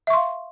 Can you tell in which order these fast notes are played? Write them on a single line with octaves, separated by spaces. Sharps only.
E5 C#6 C6 F5